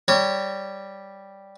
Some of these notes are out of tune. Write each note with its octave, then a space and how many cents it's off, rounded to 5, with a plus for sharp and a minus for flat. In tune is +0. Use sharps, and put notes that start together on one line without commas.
G3 +0 C#5 +0 A#5 -45